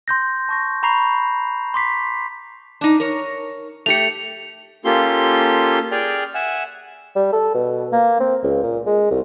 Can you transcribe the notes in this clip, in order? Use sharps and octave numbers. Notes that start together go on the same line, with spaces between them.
C6 G6 A#6
A5 C#6 A#6
A#5 B5 C#6 A#6 C7 F7
C6 D6 B6 C7
D4 D#4
A#4 C#5
A3 G4 C#7 F7
A#3 C#4 F4 G4 A4 C6
G#4 D5 G5 G#5 F6
E5 F#5 G#5
G3
A4
B2
A#3
C4
C#2
A#2
G#3
C2